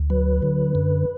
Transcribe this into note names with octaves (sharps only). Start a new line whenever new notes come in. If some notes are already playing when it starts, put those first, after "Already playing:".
Already playing: D2
F#3 B4
D3
F#2